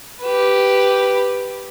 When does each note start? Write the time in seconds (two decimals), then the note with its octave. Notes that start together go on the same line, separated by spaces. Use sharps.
0.22 G4 B4